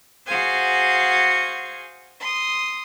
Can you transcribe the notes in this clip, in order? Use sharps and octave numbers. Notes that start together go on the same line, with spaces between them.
F#4 G#4 C5 F5 G#5
C6 D#6